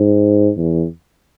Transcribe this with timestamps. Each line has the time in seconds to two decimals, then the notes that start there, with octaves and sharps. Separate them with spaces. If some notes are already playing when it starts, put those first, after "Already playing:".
Already playing: G#2
0.57 E2